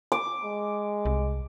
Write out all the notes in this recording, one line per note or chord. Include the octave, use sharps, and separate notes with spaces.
D6
G#3
C2